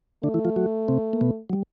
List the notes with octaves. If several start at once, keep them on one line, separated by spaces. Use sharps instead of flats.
D3 A3 D4
E3 E4
F3 F4
F#3 F#4
C3 C4
A#3
B2 B3
F#3
G3